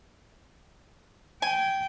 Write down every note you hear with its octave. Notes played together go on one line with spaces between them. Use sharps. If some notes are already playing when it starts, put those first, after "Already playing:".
G5 G#5